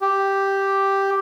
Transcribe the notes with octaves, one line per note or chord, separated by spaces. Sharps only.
G4